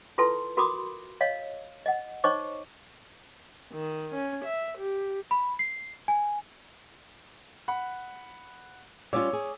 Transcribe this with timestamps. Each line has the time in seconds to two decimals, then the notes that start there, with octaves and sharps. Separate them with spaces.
0.18 E4 F4 A4 B4 A5 C6
0.57 F#4 A#4 B5 C6 D6 D#6
1.21 C#5 D#5 F5
1.86 D#5 F#5
2.24 D#4 C5 C#5 D#5 C#6 D6
3.73 D#3
4.14 C#4
4.45 E5
4.78 G4
5.31 B5
5.59 C7
6.08 G#5
7.68 F#5 B5
9.13 G3 C#4 F4 C#5 D6 E6
9.33 G#4